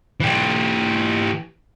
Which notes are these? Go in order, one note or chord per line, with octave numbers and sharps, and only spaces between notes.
E3 G4